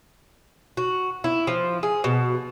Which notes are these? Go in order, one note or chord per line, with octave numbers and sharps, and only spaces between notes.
F#4
E4
F3
G#4
B2